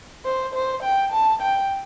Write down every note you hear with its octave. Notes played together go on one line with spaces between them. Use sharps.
C5
C5
G5
A5
G5